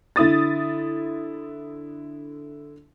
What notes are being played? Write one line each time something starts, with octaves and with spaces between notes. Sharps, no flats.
D3 E4 D#6 A6